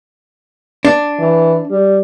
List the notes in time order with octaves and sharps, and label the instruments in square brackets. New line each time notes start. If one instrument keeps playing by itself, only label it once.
[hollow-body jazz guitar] D4
[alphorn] E3
G3